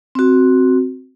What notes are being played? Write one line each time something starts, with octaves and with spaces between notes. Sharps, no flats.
C4 F#4